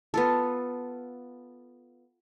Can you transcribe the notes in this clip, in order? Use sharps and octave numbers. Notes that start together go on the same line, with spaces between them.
B3 F4 A4